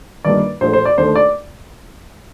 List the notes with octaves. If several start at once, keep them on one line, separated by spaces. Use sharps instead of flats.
G1 G2 D#3 G3 A#3 D5
A#1 A2 A3 C5
C5
D5
D#2 D3 A3 C5
D5